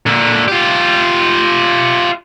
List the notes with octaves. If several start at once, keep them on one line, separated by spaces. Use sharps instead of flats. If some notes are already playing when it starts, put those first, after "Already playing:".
A#2 D3
F4 G4